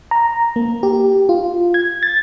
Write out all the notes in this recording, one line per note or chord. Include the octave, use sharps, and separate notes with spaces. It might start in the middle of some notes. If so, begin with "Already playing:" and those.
A#5
A#3
G4
F4
G#6
A6